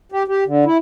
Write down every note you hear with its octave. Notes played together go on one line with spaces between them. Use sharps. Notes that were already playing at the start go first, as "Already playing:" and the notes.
G4
G4
D3
E4